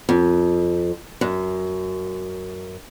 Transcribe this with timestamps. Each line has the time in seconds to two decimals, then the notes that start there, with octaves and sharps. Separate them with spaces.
0.09 F2
1.21 F#2